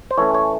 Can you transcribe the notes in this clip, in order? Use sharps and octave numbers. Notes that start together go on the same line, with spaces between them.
C5
E3 A3 C#4 C#5
C#5